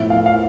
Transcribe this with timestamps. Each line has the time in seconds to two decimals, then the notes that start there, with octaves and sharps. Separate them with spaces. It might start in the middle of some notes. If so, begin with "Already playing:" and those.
Already playing: A2 F3 B3 E5
0.10 F5
0.26 F5